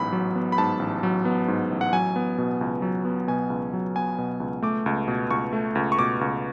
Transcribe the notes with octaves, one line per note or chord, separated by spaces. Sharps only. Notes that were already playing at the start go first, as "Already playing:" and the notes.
Already playing: A1 G#2 F#3 B3 B5
F#3
B3
B5
G#2 A5
A1
F#3
B3
G#2
A1
F#5
F#3 G#5
B3
B2
C#2
F#3
B3
B2 G#5
C#2
F#3
B3 G#5
B2
C#2
A3 D6
C#2
B2
C#2 C#6
A3
C#2
C#6
B2 D6
C#2